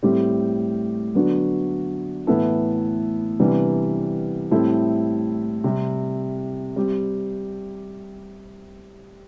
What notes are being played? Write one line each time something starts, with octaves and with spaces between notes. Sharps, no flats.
A2 G3 C4 G4
D3 F#3 B3 D4 F#4
A2 E3 B3 E4 A4
C3 E3 G3 B3 D4
A2 G3 C4 E4 A4
C3 G3 C4
G3 C4 G4